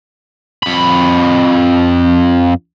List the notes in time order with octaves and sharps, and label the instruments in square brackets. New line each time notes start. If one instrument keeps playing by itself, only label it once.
[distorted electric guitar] F2 B5